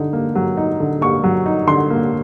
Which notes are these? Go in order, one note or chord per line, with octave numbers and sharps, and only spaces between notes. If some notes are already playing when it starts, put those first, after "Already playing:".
Already playing: D3 D#4
A#3
F#3
D#4
D3
A#3 C#6
F#3
D#4
D3 C6
A#3